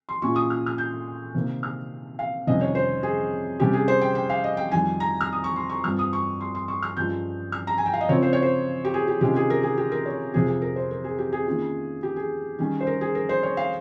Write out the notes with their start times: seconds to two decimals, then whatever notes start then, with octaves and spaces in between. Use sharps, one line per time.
0.09 C6
0.22 A#2 G#3 C#4 F4 C#6
0.36 D#6
0.50 F6
0.66 F6
0.78 G6
1.35 C3 D#3 A#3
1.63 F6
2.19 F5
2.47 F2 C3 D#3 G3 C#4 D#5
2.61 C#5
2.75 C5
3.03 G#4
3.60 C3 G3 C#4 G4
3.73 G#4
3.88 C5
4.01 G5
4.15 G5
4.30 F5
4.44 D#5
4.57 G5
4.71 F2 D#3 G3 G#5
5.00 A#5
5.21 F6
5.32 D#6
5.44 C#6
5.56 C6
5.70 C#6
5.84 G2 G3 C4 F4 F6
5.99 D#6
6.13 C#6
6.41 C6
6.55 C6
6.68 C#6
6.82 F6
6.97 G2 F3 G#3 C#4 F4 G6
7.52 F6
7.67 A#5
7.78 G#5
7.86 G5
7.93 F5
8.01 D#5
8.09 C#3 F3 C4 F4 C#5
8.23 C5
8.33 C#5
8.42 C5
8.85 G4
8.94 G#4
9.08 G4
9.21 C3 D#3 G#3 C#4 F4 G4
9.36 G#4
9.50 A#4
9.63 G#4
9.77 G4
9.92 A#4
10.06 C#5
10.34 F2 C3 F3 G#4
10.48 G#4
10.62 A#4
10.76 C5
10.91 A#4
11.04 G#4
11.18 G4
11.32 G#4
11.47 D#3 A#3 C#4 F4
12.03 G4
12.16 G#4
12.59 D#3 G3 C#4
12.81 C5
12.87 A#4
13.01 G#4
13.15 A#4
13.29 C5
13.43 C#5
13.57 F5